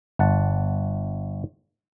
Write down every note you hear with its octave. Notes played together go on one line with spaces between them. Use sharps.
G1 F#5 A5